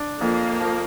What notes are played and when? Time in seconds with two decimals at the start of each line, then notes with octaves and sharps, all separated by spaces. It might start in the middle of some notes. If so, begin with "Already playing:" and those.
Already playing: D4
0.20 F2 A#3
0.60 F3